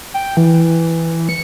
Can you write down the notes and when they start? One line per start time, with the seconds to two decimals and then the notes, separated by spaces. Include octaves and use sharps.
0.14 G5
0.37 E3
1.29 C#7